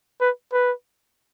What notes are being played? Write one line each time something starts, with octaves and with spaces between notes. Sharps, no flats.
B4
B4